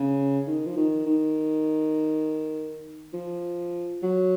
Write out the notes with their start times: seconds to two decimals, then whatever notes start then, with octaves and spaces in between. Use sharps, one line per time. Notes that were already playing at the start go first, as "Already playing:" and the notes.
Already playing: C#3
0.47 D#3
0.66 F3
0.77 D#3
1.06 D#3
3.14 F3
4.03 F#3